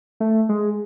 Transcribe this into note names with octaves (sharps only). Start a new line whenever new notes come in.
A3
G#3